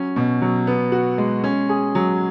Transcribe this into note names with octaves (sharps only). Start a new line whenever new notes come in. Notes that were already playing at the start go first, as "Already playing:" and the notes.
Already playing: F#3 C#4
B2
F#3
B3
F#4
G#3
C#4
G#4
F#3